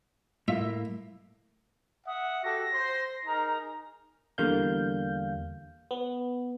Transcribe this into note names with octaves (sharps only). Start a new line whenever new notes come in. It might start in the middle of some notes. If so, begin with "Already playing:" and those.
A2 A#3 F4 E5
E5 F#5 D#6
F#4 G4 A4 A#6
C5 C6
D#4 G#4 A#4 A#5
E2 D3 G3 A#3 F5 G6
B3